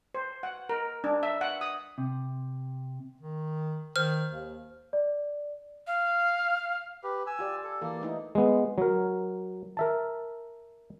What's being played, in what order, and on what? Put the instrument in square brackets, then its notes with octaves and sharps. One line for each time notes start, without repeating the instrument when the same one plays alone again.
[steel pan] C5
F#5
A#4
D4
E5
F#5
D#6
[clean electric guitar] C3
[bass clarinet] D#3
[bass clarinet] D#3 [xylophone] C5 F6
[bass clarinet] D#2
[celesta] D5
[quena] F5
[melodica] G4 B4
G#5 E6
[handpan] F4 G4 D5
[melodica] A4
[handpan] E3 A4 [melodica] A#3
[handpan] A3 D#4 E4
[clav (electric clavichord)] G#3 B3
F#3 A#4
A#4 E5 A5